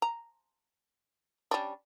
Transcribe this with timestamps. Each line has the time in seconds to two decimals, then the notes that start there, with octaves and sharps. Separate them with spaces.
0.02 A#5
1.51 G3 C#4 D4